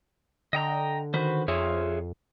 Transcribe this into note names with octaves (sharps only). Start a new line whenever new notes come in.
D3 D#5 G5 A#5
D#3 F#4 B4 C5
F2 F4 G#4 C#5 E5